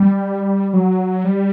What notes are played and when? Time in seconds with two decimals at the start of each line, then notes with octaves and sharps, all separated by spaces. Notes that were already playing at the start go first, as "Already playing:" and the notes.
Already playing: G3
0.73 F#3
1.24 G3